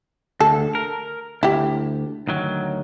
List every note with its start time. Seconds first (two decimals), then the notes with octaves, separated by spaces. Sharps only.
0.40 D2 A4
0.75 A#4
1.43 D2 E4 G4
2.27 D2 D#3 F#3